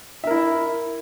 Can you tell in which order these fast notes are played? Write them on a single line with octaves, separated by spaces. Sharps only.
E5 A#4 E4